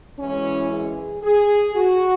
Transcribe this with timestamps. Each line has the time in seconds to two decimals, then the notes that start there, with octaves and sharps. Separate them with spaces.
0.18 F#2 E3 G#3 C#4
0.71 G#4
1.23 G#4
1.75 F#4